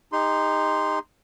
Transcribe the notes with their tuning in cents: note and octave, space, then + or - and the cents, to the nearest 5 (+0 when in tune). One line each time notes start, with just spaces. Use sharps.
D#4 +0 G4 +45 C6 -10